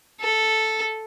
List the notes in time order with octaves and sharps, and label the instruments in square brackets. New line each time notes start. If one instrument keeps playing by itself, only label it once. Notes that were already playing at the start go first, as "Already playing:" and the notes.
[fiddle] A4